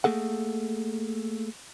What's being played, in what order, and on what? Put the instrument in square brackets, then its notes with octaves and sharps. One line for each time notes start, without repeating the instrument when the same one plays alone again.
[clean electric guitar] A3 A#3 G#4 A4 F#5